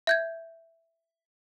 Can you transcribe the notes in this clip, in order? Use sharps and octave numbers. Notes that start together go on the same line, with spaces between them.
E5 G6 G#6